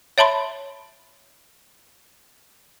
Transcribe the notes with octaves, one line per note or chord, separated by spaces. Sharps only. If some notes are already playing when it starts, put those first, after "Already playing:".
C#5 E5 A5 B5 C6